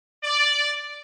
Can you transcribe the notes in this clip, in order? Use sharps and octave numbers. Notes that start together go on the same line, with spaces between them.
D5